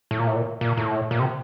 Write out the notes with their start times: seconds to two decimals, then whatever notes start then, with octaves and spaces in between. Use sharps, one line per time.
0.11 A2
0.19 A#2
0.27 A2
0.36 A#2
0.61 A#2
0.77 A2
1.11 A#2
1.20 C3